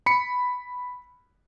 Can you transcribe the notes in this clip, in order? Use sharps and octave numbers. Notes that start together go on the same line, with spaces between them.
B5 C#7